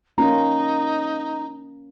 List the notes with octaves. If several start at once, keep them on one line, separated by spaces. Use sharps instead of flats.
A#3 C#4 D#4 F4 A#5